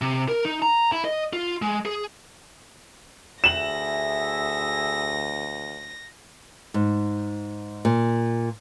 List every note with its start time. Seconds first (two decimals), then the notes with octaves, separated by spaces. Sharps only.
0.02 C3
0.28 A#4
0.45 D#4
0.62 A#5
0.92 E4
1.04 D#5
1.33 F4
1.62 G#3
1.85 G#4
3.44 D2 G#4 E5 A#6 E7 F#7
6.74 G#2
7.85 A#2